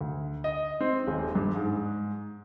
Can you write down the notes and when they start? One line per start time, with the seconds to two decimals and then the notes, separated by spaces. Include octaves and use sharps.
0.01 D2
0.44 D#5
0.80 C4
1.07 D#1
1.35 G2
1.55 G#2